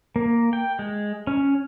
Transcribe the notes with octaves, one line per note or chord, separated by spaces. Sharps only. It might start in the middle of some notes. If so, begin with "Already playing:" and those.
A#3
G5
G#3
C#4